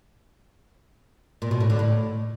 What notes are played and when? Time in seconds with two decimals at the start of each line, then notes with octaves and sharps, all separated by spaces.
1.42 A#2
1.51 B2
1.60 A2
1.70 D3
1.79 A2